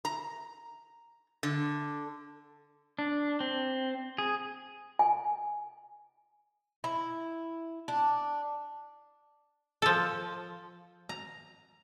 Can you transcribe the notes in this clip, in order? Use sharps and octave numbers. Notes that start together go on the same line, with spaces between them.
A#5
D3
D4
C4
G#4
G#5
E4
D4
F3 A4
A#5